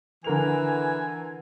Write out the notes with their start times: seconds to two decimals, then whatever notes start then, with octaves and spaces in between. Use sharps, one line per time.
0.24 D3 E3 A#4 G#5 F7